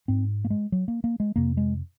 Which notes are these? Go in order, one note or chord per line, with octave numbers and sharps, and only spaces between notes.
G#2 C4
A#3
G#3
F#3
A#3
A#3
G#3
F2 C3 A#3
G#3